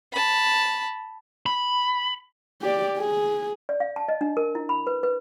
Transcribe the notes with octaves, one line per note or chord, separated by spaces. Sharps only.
A5 B5
B5
G4 D5
G#4
D5
F5
A5
D#5
D4
A#4
E4
B5
B4
B4